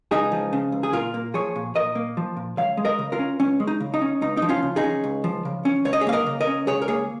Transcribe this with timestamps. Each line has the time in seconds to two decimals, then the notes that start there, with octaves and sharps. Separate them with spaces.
0.11 C#2 D#4 G#4
0.32 F3
0.53 C#3
0.72 C#2
0.83 G#4
0.93 A#2 F4 A#4
1.14 A#3
1.34 F3 G#4 C#5
1.56 A#2
1.75 A#2 A#4 D#5
1.95 A#3
2.17 F3
2.37 A#2
2.57 C#2 C#5 F5
2.77 G#3
2.85 A#4 D#5
2.99 C#3
3.12 F4 A#4
3.19 C#4
3.40 C#2 C#4
3.60 G#3
3.67 D#4
3.80 C#3
3.94 D#4
4.02 C#4
4.22 C#2 D#4
4.37 F3 D#4
4.49 C#4 F4
4.62 C#3
4.76 D#4 G#4
4.83 C#4
5.04 C#2
5.24 F3
5.45 C#3
5.65 C#4
5.85 C#2 C#5
5.93 D#5
6.01 G#4 C#5
6.07 A#3 F5
6.12 A#4 D#5
6.27 C#3
6.41 A#4 D#5
6.47 C#4
6.67 C#2 G#4 C#5
6.82 A#4
6.88 A#3 G#4 C#5